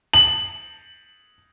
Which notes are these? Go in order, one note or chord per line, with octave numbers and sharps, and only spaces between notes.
F#7